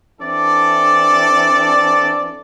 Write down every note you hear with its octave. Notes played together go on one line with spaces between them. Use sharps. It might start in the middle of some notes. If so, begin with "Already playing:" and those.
E3 C4 D4 E4 A4 D5